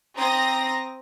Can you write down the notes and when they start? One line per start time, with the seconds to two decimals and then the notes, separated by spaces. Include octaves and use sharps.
0.15 C4 A#5 D#6 A#6